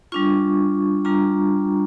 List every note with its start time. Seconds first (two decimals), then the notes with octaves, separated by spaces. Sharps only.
0.12 G3 D4 F4 C#6
1.05 G3 D4 F4 A#5